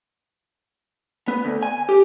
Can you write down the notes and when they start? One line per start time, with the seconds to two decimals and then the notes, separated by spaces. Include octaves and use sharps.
1.28 B3
1.45 D2
1.63 G#5
1.89 G4